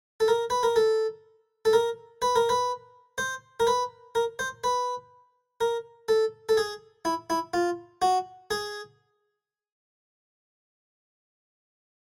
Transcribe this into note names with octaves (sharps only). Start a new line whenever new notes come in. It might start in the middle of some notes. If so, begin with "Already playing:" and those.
A4
A#4
B4
A#4
A4
A4
A#4
B4
A#4
B4
C5
A#4
B4
A#4
C5
B4
A#4
A4
A4
G#4
E4
E4
F4
F#4
G#4